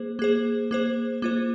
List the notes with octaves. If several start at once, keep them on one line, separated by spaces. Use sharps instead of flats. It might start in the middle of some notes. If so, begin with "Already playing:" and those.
Already playing: A#3 G#4 C5
A#3 G#4 C5
A#3 G#4 C5
A#3 F4 C5